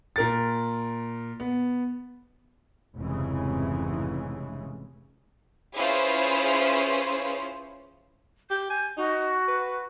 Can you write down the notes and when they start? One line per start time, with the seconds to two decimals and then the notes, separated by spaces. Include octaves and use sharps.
0.16 A#2 A#4 A6
1.40 B3
2.95 F1 G#2 C#3 E3
5.77 C#4 E4 F4 G#4 B4 C5
8.50 G4 G6
8.70 G#5 G6
8.97 D#4 F#4
9.48 B4